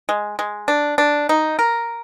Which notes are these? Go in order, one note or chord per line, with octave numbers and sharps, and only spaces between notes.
G#3
G#3
D4
D4
D#4
A#4